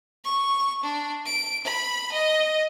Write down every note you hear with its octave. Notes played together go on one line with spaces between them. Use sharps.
C#6
D4
D7
B5
D#5